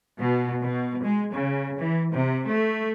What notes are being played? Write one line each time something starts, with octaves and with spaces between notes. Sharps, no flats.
B2
B2
G#3
C#3
E3
C3
A3